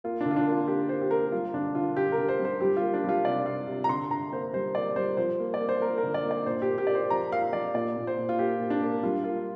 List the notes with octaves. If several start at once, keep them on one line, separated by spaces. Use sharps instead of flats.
A#3 F4
D3 D4
F4
D4
A#3 F4
A#3 G4
A#3 C5
G4
A#3 A#4
G3 F4
D3 D4
D3 F4
D3 G4
A#4
D3
C5
G3
C5
G3 G4
F4
A#3
D4
G3 F4
C3 D5
C3 F5
C3
A#5
D3 C6
D3 A#5
A#3 C5
G3 C5
A#3 D5
G3 C5
F3 C5
A#3
D5
A#3
C5
A#3 A#4
A#4
D3
D5
A#3
D5
A#2 C5
G4
A#3
G4
A#3 D5
C5
F3 A#5
A#3 F5
F3 D5
A#2 D5
A#2
C5
A#2
F4
A#3 G4
A#2
D4
A#3
G3 F4
A#3 F4